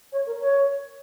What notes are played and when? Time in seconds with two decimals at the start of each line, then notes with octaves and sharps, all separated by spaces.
0.12 C#5
0.26 A#4
0.41 C#5